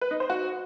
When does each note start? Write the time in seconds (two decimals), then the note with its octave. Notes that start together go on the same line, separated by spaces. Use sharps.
0.01 B4
0.11 D#4
0.20 C5
0.30 F#4